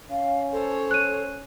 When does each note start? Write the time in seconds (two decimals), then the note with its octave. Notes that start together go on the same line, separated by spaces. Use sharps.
0.10 C#4 F5
0.53 A4 C5 C#5
0.91 F#6 D#7